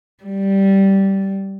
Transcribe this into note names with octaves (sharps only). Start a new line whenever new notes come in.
G3